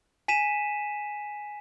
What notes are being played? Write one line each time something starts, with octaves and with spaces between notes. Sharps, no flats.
G#5 B6 D#7 E7